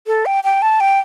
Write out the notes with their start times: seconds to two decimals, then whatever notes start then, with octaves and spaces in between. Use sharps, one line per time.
0.07 A4
0.26 G5
0.44 G5
0.62 A5
0.80 G5